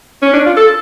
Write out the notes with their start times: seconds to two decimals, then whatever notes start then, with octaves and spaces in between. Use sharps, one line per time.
0.22 C#4
0.34 D4
0.46 F4
0.57 A4